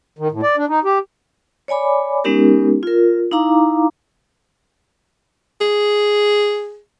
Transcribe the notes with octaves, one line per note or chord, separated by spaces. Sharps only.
D#3
A2
D5
D4
D#4
G4
C#5 D5 G#5 B5 D6
G#3 B3 C#4 D#4 G4 A#4
F4 A#4
D#4 E4 F5 A#5 D6
G#4